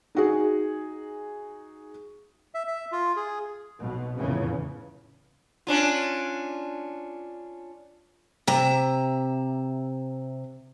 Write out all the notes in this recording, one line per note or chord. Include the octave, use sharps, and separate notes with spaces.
D#4 F#4 G#4
E5
E5
F4
G#4
B1 B2
F1 E2 A2 C#3 E3 C#4
C#4 D4 F4
C3 E5 A#5